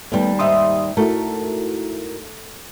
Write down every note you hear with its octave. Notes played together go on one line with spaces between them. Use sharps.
D#2 G3 A3 B3 B4
G#2 D#4 E5 C6 D#6
A3 E4 F#4 A#4